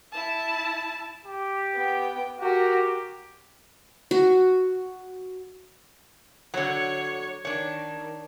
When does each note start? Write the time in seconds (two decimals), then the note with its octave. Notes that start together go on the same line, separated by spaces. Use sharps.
0.12 E4 A5
1.25 G4
1.75 B3 G5
2.40 F#4 G4 A#4
4.11 F#4
6.54 D3 F#3 C#5 C#6
7.45 D#3 D4 C#5